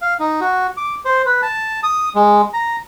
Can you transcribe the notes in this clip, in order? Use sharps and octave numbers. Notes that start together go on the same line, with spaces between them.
F5
D#4
F#4
D6
C5
B4
A5
D#6
G#3
A#5